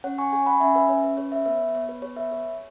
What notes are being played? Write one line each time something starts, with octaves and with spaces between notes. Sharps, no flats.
C#4 C#5 F#5
G#5 C#6
G#4 G#5 C#6
F#5 B5
C#4 E5 G#5
B4 E5
C#4 C#5
B4
G#4 C#5
B4 E5
B3 B4 E5
C#5
B3 C#5
B4
G#4 C#5
B4 E5
G#4 C#5